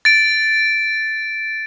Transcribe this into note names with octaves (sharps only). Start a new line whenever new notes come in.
A6 D7